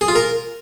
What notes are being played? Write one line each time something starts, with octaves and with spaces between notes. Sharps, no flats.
G#4
F4
A#4